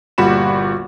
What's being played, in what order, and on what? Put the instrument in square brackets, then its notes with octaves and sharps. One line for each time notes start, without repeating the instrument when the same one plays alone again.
[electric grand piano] G1 A#2 G3 F#4 B5 E7